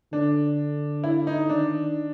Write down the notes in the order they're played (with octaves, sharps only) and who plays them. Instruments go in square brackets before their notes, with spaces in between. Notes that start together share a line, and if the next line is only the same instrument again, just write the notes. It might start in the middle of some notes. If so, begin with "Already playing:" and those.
[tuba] D3 [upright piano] D4
[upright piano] E4
D#4
[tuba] D#3 [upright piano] D4